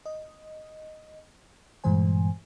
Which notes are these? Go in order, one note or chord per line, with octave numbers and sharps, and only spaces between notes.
D#5
G2 A#2 E3 G#3 C5 G#5